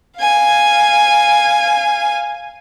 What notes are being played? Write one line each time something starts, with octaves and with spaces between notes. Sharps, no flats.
F5 G#5